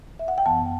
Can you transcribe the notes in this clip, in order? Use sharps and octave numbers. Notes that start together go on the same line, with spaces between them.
E5
F#5
G5
F#2 E3 B3 A5